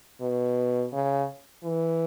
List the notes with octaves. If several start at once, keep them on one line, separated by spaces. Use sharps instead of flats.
B2
C#3
E3